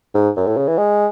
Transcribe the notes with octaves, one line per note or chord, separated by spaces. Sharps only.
G#2
F#2
A2
C#3
E3
G#3